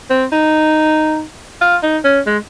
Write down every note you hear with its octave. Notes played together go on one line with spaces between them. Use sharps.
C4
D#4
F4
D#4
C#4
G#3